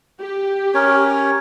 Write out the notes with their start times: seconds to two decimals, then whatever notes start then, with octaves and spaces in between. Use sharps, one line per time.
0.20 G4
0.74 C#4 A#4 C#5